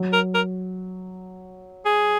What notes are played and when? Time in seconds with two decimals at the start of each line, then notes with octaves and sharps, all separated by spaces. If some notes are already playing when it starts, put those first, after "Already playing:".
Already playing: F#3
0.13 A#4
0.34 A#4
1.85 G#4